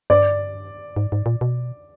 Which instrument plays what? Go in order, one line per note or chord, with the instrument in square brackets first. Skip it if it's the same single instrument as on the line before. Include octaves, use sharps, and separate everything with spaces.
[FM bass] G2 [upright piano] D5
[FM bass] G#2
G#2
A#2
B2